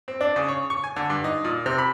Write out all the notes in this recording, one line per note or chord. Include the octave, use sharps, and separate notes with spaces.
C4
D4
C#3
C#5
C#6
G#5
D3
G2
D#4
A#2
C3
B5